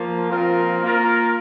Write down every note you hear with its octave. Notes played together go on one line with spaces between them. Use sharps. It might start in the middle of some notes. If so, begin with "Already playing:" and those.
Already playing: F3 A#3 F4
A#2 F3 C4 F4 A#4
A#3 F4 A#4